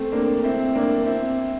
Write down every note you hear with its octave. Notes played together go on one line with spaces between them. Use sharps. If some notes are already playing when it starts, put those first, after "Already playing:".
Already playing: A3 C4
A#3 D4
C4 E4
A#3 D4
C4 E4